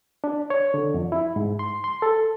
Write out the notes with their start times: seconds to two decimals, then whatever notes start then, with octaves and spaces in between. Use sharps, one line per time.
0.24 D4
0.50 C#5
0.74 D3
0.94 F2
1.12 E4
1.36 G#2
1.59 C6
1.84 C6
2.02 A4